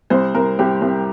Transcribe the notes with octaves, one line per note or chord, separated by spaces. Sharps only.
C2 C5
C2 A#4
C2 G4
C2